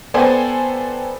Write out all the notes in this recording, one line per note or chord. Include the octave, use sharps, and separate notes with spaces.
B3 A4 C5 D5 G5 G#5